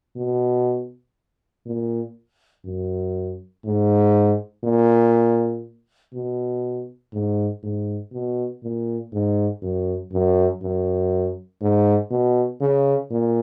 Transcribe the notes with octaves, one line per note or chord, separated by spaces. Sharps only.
B2
A#2
F#2
G#2
A#2
B2
G#2
G#2
B2
A#2
G#2
F#2
F#2
F#2
G#2
B2
C#3
A#2